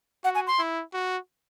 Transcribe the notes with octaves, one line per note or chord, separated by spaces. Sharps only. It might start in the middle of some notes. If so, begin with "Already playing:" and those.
F#4 F#5
G#5
C6
E4
F#4